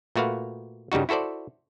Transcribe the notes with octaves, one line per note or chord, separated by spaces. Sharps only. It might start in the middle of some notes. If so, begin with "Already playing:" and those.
A#2 A3 F#4 B4 F5
G2 C#3 G3 D#4 F#4
E4 F#4 A4 C5 D5